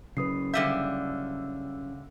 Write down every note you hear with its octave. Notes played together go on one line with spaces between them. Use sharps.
C#3 F#3 B4 D#6 C7
D3 G3 E5 F5 E6 G6